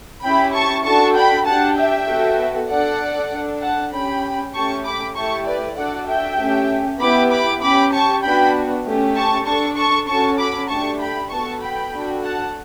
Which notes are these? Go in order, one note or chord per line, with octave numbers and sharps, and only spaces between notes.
C#4 E4 G4 G5 B5
A5 C#6
D4 F#4 A4 A5 C#6
G5 B5
D4 G4 F#5 A5
E5 G5
B3 F#4 A4
D4 A4 D5 F#5
D4 A4
F#5 A5
C#4 G4 G5 B5
A3 C#4 G4 A5 C#6
B5 D6
A3 E4 G4 A5 C#6
B4 D5
D4 F#4 A4 D5 F#5
E5 G5
A3 C#4 G4
B3 E4 G4 B5 D6
B5 D6
C#4 G4 B5 D6
A5 C#6
B3 D4 F#4 G5 B5
A3 C#4 G4
A5 C#6
D4 A4 A5 C#6
A5 C#6
C#4 F#4 A4 A5 C#6
B5 D6
A3 D4 G4 A5 C#6
G5 B5
B3 F#4 A4 A5 C#6
G5 B5
D4 F#4 A4
F#5 A5